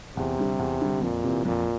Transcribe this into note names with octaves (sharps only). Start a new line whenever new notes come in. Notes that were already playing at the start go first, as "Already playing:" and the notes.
E2 C3
D3 G3
E2
D3 G3
F2 A#2
C3 E3
F2 A#2